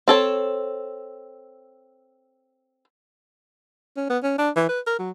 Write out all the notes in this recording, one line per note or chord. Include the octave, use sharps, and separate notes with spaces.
C4 A4 C#5
C#4
B3
C#4
D4
E3
B4
A#4
F#3